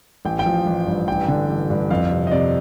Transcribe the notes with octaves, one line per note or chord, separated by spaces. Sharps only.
A1 G5
G5
F3
A1
G2
A1 G5
D3
A1
G2
F2 F5
C3
D#5
C3 D5